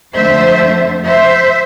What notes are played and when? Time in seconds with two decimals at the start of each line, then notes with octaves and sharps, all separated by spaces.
0.14 F2 D3 A3 C5 E5
1.05 C5 E5